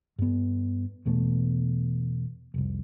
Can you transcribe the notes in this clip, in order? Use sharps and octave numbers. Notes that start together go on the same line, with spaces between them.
G2 B3
E2 B2 A3 B3
F1 C2